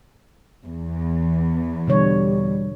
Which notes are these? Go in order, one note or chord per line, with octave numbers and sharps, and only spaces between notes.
E2
B2 D3 G3 C#5